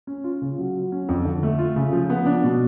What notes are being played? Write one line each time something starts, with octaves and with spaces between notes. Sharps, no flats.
C#4
F4
C#3
F#3
F#3
C#4
F2
D3
A3
F4
C#3
F3
B3
D4
B2